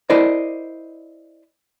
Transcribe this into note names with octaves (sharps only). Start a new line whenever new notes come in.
E4 A#4 C5 D5 D#5